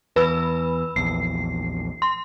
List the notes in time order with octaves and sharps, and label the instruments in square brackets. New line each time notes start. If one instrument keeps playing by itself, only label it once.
[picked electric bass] E2 [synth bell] B4 B5 E6
[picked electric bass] A#1 E2 [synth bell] C7
[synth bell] C6